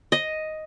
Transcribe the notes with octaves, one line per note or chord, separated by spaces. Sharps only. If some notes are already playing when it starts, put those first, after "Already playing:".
D#5